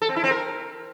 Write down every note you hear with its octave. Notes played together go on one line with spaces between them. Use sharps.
A4
C4
E4
C4
A#4